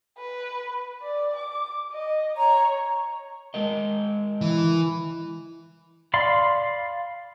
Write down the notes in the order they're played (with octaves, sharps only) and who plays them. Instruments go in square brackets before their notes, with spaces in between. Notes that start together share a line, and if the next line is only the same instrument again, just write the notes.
[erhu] B4
D5
D6
D#5
[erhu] C#5 [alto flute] A#5
[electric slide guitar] G#3 A#4 D#5
[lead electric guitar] E3
[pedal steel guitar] D5 F5 B5 C6